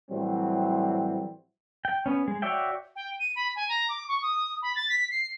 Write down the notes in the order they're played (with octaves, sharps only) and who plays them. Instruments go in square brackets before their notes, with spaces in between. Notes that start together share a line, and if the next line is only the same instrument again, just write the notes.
[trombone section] A2 E3 F#3 G3 C4
[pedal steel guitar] G5
B3 C#4
G#3
F#4 C#5 D5 E5 G5
[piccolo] G5
D#7
B5
G#5
A#5
D6
C#6
D#6
B5
A6
B6
C7